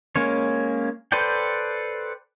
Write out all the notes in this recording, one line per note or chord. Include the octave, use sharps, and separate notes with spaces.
G#3 A#3 C#4 C#5
A4 B4 C5 D5 G5